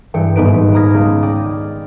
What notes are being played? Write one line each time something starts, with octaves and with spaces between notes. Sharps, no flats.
G2 E3 G#4 G5 C#7
D#1 G#2 B3 D#4 B4 D7
A#5 B5 D#6 F6 G#6 A#6
C#2
D5 D#5 G5